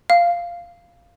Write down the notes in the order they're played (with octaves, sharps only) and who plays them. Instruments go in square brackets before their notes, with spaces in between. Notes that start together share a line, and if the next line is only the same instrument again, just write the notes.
[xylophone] F5